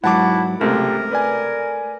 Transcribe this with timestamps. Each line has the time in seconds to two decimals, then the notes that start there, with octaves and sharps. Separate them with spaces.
0.04 G#2 F#3 E4 F#5 A5 D6
0.61 C#2 C3 A3 A#4
1.11 B4 D5 G#5